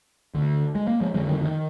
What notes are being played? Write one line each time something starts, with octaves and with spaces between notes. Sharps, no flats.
D2 D3
G#3
A#3
F3 G#3
F2 D3 F3 G#3
D#3 G3
D#3